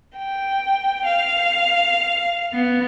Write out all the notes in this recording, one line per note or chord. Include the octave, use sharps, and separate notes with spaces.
G5
F5
B3